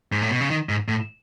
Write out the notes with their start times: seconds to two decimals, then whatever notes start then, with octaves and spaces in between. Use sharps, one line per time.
0.12 G#2
0.22 A2
0.31 B2
0.41 C#3
0.50 D#3
0.69 G#2
0.88 A2